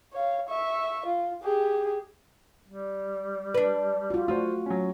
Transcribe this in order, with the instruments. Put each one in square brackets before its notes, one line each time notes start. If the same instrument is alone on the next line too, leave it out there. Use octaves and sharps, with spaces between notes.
[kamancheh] C#5 F5
E5 C#6
F4
G4 G#4
[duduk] G3
[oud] D4 B4
[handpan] F4 F#4
[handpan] A3 F#4 [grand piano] F4 C5
[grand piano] F#3 C#4